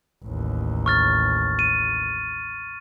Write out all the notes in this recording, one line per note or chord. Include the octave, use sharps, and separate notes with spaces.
A1 D#2
C#6 F6 A6
D#7